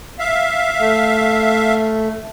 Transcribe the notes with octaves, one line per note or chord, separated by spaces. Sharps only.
E5 F5
A3